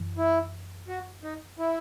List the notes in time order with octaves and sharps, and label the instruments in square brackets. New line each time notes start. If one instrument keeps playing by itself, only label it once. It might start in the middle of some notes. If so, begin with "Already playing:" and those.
Already playing: [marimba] F#2 E3
[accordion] E4
F#4
D#4
E4